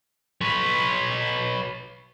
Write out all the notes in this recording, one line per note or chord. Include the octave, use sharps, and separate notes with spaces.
B4 C#5